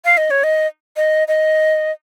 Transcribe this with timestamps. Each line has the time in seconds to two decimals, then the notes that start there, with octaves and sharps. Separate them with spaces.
0.05 F5
0.17 D#5
0.31 C#5
0.44 D#5
0.96 D#5
1.28 D#5